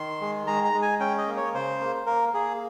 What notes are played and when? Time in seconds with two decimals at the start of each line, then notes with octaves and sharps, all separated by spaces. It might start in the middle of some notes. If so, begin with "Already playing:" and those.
Already playing: D#3 C6
0.21 G#3
0.47 G#3 A#5
0.65 A#5
0.74 G#3
0.82 G#5
1.00 C#4 G5
1.18 D#5
1.27 A#3
1.37 C#5
1.54 C#3 C5
1.81 A#3
2.06 A#3 A#4
2.34 A#3 G#4